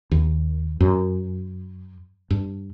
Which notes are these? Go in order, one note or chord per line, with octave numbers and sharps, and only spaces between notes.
D#2
F#2
G2